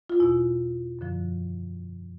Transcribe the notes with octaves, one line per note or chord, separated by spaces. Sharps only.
F4
E2 B2 E4
F#2 D3 F3